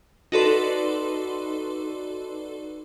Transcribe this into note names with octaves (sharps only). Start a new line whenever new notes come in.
D#4 F#4 A4 B4 D5 C6